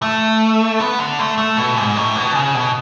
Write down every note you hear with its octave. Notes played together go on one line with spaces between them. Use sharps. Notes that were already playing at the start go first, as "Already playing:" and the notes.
A3
B3
D3
A3
A3
B2
G#2
A2
B2
C#3
B2